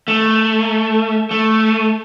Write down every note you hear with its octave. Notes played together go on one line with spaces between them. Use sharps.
A3
A3